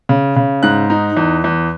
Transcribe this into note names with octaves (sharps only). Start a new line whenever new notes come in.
C#3
C#3
G#2 F#6
D#4
E2
E2